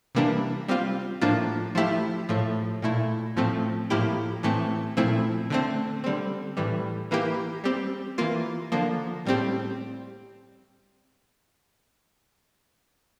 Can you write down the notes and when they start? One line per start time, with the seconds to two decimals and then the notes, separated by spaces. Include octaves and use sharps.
0.15 C3 E3 G3 A#3 D4
0.68 G3 C4 F4
1.21 A2 F3 A#3 D4 F4
1.75 F3 A3 E4 G4
2.29 A2 F3 A3
2.82 A#2 A3 E4
3.37 A2 F3 A3 C4
3.90 A2 F3 A#3 E4 G4
4.43 A2 E3 A3 C4
4.97 A#2 F3 A3 C4 E4
5.50 D3 A3 C4
6.04 D3 G3 C4
6.57 A2 E3 G3
7.11 E3 A#3 E4 G4
7.64 G3 C4 G4
8.18 E3 A#3 F4
8.72 D3 F3 A#3
9.25 A2 G3 C4 G4